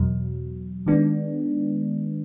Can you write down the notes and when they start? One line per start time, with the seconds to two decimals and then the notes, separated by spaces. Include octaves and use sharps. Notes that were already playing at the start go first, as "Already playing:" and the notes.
Already playing: E2 B2 F#3
0.86 D#3 G#3 B3 D4